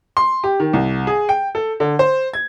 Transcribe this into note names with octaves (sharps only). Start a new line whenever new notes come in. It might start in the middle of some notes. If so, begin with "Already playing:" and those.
C6
G4
D#3
C2
G#4
G5
A4
D3
C5
G#6